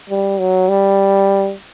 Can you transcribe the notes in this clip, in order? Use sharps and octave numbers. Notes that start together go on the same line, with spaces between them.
G3
F#3
G3